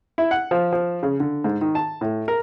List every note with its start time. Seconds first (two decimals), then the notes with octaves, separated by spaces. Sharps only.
0.18 E4
0.31 F#5
0.51 F3
0.72 F3
1.03 C#3
1.20 D3
1.44 G#2
1.61 D#3
1.75 A5
2.01 A2
2.28 A#4